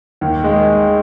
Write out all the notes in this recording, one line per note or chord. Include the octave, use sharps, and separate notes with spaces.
D#2
G#3